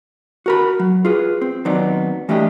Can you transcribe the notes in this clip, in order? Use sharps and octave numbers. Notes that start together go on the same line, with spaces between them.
F#4 A#4 B5
F#3
F4 G#4 B4
C4
D#2 F#3 B3 C4 D#4 D5
E3 G3 A3 D4 G4 D#5